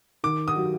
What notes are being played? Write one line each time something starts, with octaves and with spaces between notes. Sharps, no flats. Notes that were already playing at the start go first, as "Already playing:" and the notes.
D#3 D6
D#6
F#3